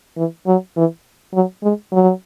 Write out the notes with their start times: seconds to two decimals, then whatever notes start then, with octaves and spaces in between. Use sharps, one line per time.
0.17 E3
0.47 F#3
0.76 E3
1.34 F#3
1.63 G#3
1.93 F#3